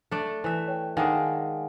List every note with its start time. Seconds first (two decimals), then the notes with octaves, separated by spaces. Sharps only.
0.11 A3 D4
0.44 E3 E5
0.68 C#5 G5
0.97 D#3 G#3 D4 F5 F#5 G#5